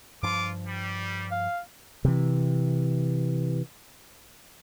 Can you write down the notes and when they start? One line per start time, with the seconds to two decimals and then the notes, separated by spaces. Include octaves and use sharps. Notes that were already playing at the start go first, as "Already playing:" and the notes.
0.23 G2 F3 F4 D6
0.68 G3
1.32 F5
2.05 C3 E3